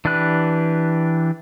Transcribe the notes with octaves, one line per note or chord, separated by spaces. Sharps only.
E3 D4 G4 B4 F#6